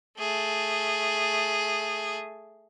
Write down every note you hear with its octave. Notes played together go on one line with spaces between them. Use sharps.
A3 G#4